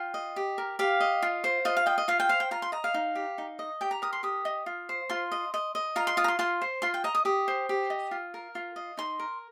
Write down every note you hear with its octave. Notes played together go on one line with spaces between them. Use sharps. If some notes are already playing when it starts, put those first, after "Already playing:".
Already playing: F4 G5
D#5
G4
A#4
G4 F5
D#5
F4
C5
F4 D#5
F5
D#5 G5
D#5
F4 F5
G5
C5 F5
G5
F4 A#5
C6
D#5 A#5
F5
D#4
G4
D#4
D#5
G4 G5
A#5
A#4 D#6
C6
G4 D#6
D#5
F4
C5
F4 C6
D#5
D#5
D#5
F4 A#5
C6
F4 D#6
A#5
C6
F4 C6
C5
F4 C6
G5
D#5 A#5
D#6
G4 D#6
C5
G4
D#5
F4
A#4
F4
D#5
D#4 C6
A#4